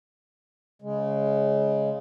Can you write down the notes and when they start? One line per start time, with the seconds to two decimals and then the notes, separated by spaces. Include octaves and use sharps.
0.82 C#3 G#3